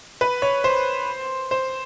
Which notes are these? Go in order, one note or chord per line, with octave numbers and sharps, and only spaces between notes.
B4
C#5
C5
C5